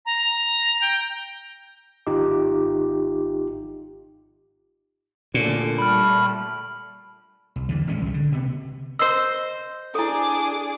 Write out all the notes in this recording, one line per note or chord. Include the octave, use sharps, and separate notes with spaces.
A#5
G5
G#1 D#4 F4 G4 D6
D2 A#2 D3 C#4
G3 A3 B5 F6
C2
E2 D3 E3
G#1 A#2 G#3 C#4
C2 G2
D3
C3 B3
C5 D#5 E6 C7
D4 E4 G#4 A4 D6